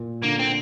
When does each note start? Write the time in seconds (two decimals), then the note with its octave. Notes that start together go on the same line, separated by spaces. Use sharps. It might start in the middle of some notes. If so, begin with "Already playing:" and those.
Already playing: A#2
0.23 D3 A#3
0.39 C4